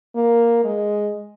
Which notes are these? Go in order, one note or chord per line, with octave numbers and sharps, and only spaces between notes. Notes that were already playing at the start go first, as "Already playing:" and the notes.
A#3
G#3